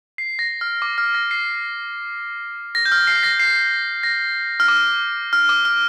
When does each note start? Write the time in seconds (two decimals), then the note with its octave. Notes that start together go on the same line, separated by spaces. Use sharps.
0.18 C7
0.39 A#6
0.61 F6
0.82 D6
0.98 F6
1.14 A#6
1.31 C7
2.75 A#6
2.85 G6
2.92 F6
3.07 C7
3.23 A#6
3.39 C7
4.03 A#6
4.60 F6
4.68 D6
5.33 F6
5.49 D6
5.65 F6